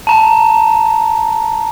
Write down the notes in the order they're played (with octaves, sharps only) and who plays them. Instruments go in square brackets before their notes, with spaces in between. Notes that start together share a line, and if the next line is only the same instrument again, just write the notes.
[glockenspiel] A5 A#5